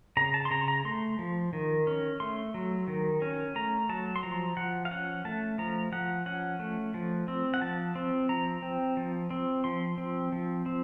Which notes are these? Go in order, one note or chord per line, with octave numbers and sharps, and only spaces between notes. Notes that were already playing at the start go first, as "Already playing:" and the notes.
C#3 A#5
A5
C6
C#3 A#5
A#5
A3 C6
F3
D#3
C#4
A3 C6
F#3
D#3
C#4
A3 A#5
F#3 A5
C6
F3 A#5
F3 F#5
F5
C#4 F#5
A3 A5
F3 A#5
F3 F#5
C#4 F#5
A3
F3
C4
F#5
F3 A5
C4
F3 A#5
C4
F3
C4
F3 C6
C4
F3
C4